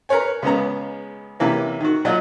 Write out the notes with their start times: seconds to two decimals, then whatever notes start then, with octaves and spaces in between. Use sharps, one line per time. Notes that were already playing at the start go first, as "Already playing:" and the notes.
0.09 A#4 B4 C#5 G#5
0.42 C#2 C#3 G#3 B3 C#4 A#5
1.40 C3 E3 A#3 C#4
1.80 D#3 F#4
2.05 A#2 F#3 F4 D#5 F#5